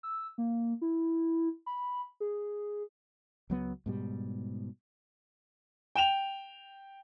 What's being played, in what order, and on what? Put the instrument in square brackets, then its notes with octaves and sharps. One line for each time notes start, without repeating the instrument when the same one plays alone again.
[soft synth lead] E6
A#3
E4
B5
G#4
[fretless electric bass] C#2 F#3 B3
G#2 B2 G3
[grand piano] G5 E7 F7